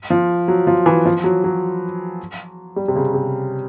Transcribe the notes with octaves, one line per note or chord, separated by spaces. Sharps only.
F3
F#3
F3
E3
F3
F#3
F#3
G3
C3
C#3
C3